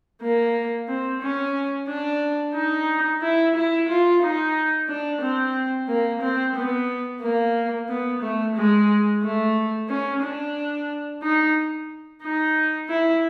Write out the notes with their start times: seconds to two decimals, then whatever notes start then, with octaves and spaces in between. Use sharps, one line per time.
0.22 A#3
0.88 C4
1.21 C#4
1.88 D4
2.55 D#4
3.22 E4
3.55 E4
3.89 F4
4.22 D#4
4.88 D4
5.22 C4
5.88 A#3
6.22 C4
6.56 B3
7.22 A#3
7.89 B3
8.22 A3
8.56 G#3
9.22 A3
9.89 C#4
10.22 D4
11.22 D#4
12.23 D#4
12.89 E4